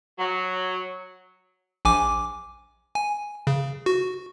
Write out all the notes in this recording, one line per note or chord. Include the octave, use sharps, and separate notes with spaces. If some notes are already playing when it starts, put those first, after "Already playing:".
F#3
A#1 G#5 D6
G#5
C#3
F#4